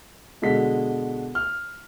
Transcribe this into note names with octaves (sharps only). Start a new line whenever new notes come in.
B2 D3 G#3 B6
F6